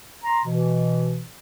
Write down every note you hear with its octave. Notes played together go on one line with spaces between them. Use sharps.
A#5 C6
B2 E3